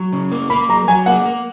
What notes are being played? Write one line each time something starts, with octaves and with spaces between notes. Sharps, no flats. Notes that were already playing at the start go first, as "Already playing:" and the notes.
Already playing: F#3
C#3
A#3
A#3 B5
F#3 A#5
F#3 G#5
A#3 F#5
A#3